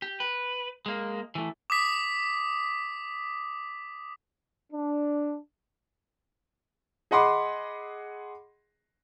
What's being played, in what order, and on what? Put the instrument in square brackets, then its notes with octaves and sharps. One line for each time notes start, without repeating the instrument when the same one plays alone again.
[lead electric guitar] G4
B4
G#3 A#3
E3 A3
[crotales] D6 D#6 B6
[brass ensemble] D4
[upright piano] G#4 D#5 F#5 B5 C6 D6